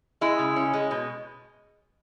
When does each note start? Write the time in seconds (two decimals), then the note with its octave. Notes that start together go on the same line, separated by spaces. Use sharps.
0.21 G#3 E4
0.39 C#3
0.56 C#4
0.73 G#3
0.91 B2